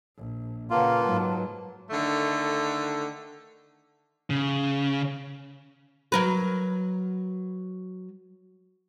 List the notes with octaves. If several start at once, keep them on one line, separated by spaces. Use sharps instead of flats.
A#1
A#2 C#3 A#3 F4 B4 F#5 A5
G#2 F#3
D3 D#3 A3
C#3
F#3 A#4 B4